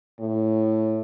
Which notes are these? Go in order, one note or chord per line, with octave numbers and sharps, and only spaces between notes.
A2